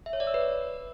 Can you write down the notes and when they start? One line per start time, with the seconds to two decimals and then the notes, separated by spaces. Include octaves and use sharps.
0.06 E5
0.13 C#5
0.20 D5
0.27 E6
0.34 B4